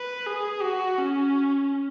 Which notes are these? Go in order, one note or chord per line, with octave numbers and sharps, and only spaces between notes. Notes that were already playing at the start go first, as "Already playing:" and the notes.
Already playing: B4
G#4
F#4
C#4